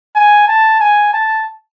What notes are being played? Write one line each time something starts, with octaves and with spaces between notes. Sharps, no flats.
G#5
A5
G#5
A5